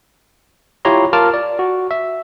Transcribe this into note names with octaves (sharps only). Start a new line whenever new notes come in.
E4 F4 G4 C#5 A#5 C6
F4 A#4 A5 D6 F6
D5
F#4
E5